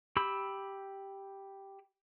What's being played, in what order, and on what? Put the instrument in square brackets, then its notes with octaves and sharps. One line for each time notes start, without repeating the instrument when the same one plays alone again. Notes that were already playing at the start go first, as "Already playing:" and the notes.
[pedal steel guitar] G4 B5 E6